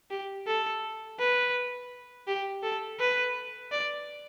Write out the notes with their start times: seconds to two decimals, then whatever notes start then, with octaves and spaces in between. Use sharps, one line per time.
0.11 G4
0.47 A4
1.19 B4
2.27 G4
2.63 A4
3.00 B4
3.72 D5